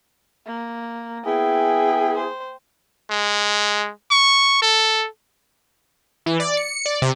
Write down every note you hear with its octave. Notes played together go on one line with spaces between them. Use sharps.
A#3
B3 E4 G#4 G5
C5
G#3
C#6
A4
E3
D5
C#7
D5
C3